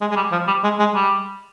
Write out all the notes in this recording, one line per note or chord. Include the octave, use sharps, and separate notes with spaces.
G#3
G#3
G3
F3
G3
G#3
G#3
G3